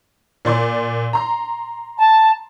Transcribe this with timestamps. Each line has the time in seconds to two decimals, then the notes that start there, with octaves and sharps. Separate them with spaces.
0.45 A#2 D5 C6
1.13 A#5 C6
1.98 A5